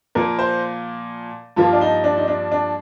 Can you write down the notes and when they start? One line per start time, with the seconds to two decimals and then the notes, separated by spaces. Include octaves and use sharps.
0.15 A#2 F3 A#3 A#4
0.39 C5
1.56 G2 F3 A#3 F4
1.73 D4
1.81 D#4
2.04 D4
2.17 D#4
2.28 D4
2.52 D4